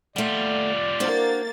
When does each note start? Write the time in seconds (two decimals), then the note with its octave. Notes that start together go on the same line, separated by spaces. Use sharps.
0.16 G3 A3 F4 D5 F#5
1.00 A#3 D4 F#4 C5 A6